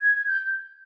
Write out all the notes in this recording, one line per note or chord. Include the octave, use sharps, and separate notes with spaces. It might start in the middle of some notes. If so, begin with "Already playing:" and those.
G#6
G#6
G6